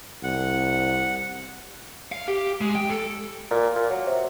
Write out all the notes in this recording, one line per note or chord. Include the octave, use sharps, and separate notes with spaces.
C2 F#5
F5
G4
G#3
G5
A4
A#2
A#2
F#3
C3